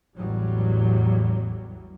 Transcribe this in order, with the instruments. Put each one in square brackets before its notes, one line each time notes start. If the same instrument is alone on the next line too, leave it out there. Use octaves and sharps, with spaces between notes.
[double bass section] A1 E2 F#3 G3